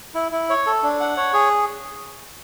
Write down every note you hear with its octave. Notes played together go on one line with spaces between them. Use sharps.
E4
E4
C#5
A4
D4
F#5
C#5
G#4